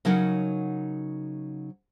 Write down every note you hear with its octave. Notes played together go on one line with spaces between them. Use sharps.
C#3 F#3 D#4 A#4 F#5